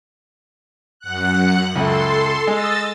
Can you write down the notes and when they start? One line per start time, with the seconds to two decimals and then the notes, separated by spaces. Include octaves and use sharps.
1.00 F#2 F#5 F#6
1.76 C#2 A3 A4 C6
2.47 G#3 D#5 E6 A6